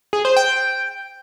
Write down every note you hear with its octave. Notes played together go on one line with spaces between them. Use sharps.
G#4
C5
G5